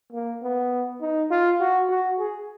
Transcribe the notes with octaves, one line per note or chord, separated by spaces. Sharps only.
A#3
B3
D#4
F4
F#4
F#4
G#4